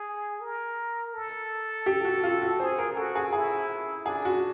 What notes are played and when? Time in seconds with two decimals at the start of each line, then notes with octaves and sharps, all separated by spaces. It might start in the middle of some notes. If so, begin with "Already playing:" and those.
Already playing: G#4
0.41 A#4
1.14 A4
1.86 G4
2.05 F#4
2.23 F4
2.42 F#4
2.60 G#4 C5
2.78 A#4
2.96 F#4 A4
3.15 G#4
3.33 E4 G#4
4.06 D4 G#4
4.25 F#4